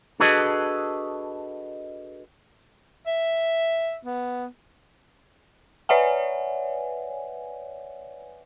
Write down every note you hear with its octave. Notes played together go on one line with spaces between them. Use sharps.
D4 F#4 G#4 A4 B4 D#5
E5
B3
B4 C#5 D5 E5 F#5 G#5